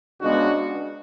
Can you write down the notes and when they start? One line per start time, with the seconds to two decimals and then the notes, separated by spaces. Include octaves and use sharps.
0.21 C#2 C#3 G#3 B3 D4 F#4